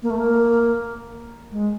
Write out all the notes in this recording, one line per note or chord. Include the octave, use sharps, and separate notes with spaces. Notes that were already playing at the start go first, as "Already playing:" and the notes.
A#3
A3
A#3
G#3